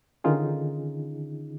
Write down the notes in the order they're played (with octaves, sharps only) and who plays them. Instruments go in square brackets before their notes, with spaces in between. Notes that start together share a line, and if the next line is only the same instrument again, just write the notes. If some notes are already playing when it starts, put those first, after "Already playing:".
[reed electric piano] D3 D#3 C#4 D#4 F4 G#4